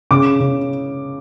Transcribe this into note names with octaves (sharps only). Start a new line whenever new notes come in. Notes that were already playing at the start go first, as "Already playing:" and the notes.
C#3 D6
C#3